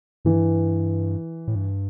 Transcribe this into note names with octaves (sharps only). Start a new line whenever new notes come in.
G2 E3
A2
G2